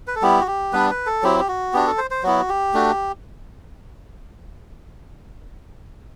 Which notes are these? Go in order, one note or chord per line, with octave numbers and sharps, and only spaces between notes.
B4
A4
G3 B3 E4 G4
F#4
G4
G3 B3 D4 B4
B4
A4
F#3 C4 E4 G4
G4
F#4
B3 D4 F#4 G4
A4
C5
C5
F#3 B3 E4 F#4
G4
A3 D4 F#4